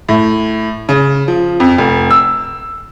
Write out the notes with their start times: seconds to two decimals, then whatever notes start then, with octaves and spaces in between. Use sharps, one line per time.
0.09 A2
0.89 C#3
1.28 F3
1.60 F2
1.78 F1
2.11 E6